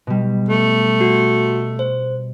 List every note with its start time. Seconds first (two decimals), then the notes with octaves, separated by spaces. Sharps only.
0.07 B2 G3
0.49 A3
1.01 F#4
1.79 C5